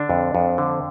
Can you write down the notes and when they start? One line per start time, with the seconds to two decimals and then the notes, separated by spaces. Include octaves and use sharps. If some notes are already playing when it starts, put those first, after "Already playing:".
Already playing: D3 D4
0.10 F2
0.35 F2
0.58 D3